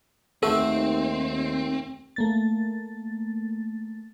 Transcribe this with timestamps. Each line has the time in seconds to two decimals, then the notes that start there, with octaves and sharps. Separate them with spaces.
0.43 D#2 A3 C4 F#4 A4
2.16 A3 A#3 A6